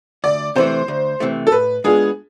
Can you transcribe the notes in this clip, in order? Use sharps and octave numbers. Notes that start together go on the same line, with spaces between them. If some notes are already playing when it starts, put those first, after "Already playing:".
D2 D5
C3 E3 A3 C5
D2
C3 E3 A3
A4
A2 B4
G#3 B3 D4 F4 G#4